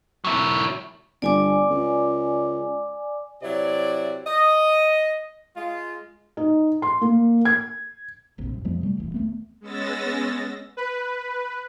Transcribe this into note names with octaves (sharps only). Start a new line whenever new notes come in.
F#3 E4
G1 D5 G#5 D6
C#2
C3 F#3 E4 D5
D#5
G#3 F4
D#4
C6
A#3
G#6
E1 A#1 C3
E1 F#2
F2 F3 G#3 B3
C3 G3 A3
D#1 C2 E3
D#1 B1 A3 B3
G#3 B3 C#4 E6 A6 A#6
B4